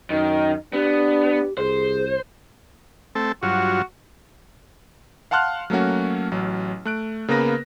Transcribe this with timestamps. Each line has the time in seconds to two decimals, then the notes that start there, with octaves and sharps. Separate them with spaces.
0.10 F#2 D#3 D#5
0.73 B3 D4 G4
1.58 C2 G#4 C5
3.15 A3 C4 A4
3.43 G2 F#3 F4 F#4
5.31 F5 F#5 A5 C6 F6 F#6
5.70 F#3 A3 A#3 C#4 F#4
6.31 A1 F#3
6.85 A3 F#6 D7
7.28 C#3 A#3 B3 A#4 B4 A#6